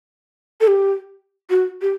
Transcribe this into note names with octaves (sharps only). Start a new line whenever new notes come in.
A4
G4
F#4
G4